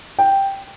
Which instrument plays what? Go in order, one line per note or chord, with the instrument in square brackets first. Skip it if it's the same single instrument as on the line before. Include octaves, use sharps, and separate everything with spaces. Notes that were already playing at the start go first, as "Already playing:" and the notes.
[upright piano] G5